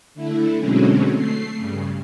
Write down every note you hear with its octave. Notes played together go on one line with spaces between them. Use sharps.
D3 A3 E4
B2 D3 F#3 G#3 C4 C#4
A3 C7
G2 C#3